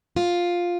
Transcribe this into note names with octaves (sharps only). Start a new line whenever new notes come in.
F4